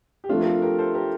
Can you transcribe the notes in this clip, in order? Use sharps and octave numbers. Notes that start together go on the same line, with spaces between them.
G4
F3 A3 C4 D4 F4
A#4
F4 A4
G4 A#4
A4 C5
G4 A#4